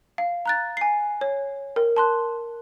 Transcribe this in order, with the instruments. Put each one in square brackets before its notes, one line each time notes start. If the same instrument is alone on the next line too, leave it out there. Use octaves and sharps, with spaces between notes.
[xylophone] F5
A#5 F#6 A6
G#5 C7
C#5
A#4
A5 C6 F#6